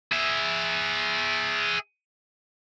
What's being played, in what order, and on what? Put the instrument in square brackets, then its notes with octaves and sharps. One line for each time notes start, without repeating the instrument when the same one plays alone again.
[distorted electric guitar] G#4 E5